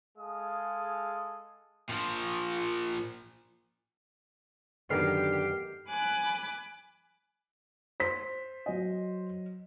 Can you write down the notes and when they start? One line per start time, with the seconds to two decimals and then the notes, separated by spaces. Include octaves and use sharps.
0.17 G#3 G#4 A4 F5 D#6
1.89 A#2 F3
4.90 F#2 D3 D#3 B3 G4 F6 C7
5.88 G#5 B5 D6 F#6
8.00 C5 B6
8.66 F#3 D#5